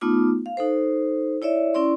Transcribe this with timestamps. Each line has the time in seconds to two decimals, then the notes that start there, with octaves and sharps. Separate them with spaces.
0.01 A3 B3 D#4 F4 D6
0.46 F5
0.57 D#4 A4 C5
1.42 E4 C#5 D5 E5
1.74 C#4 E4 D5 C6